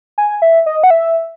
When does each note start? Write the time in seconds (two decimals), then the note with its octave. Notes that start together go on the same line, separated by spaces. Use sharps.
0.18 G#5
0.42 E5
0.66 D#5
0.83 F#5
0.90 E5